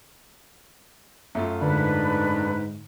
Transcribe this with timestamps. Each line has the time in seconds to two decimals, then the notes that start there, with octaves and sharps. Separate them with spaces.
1.35 F#2 A3 F4 E5
1.62 G#2 D3 D4 B4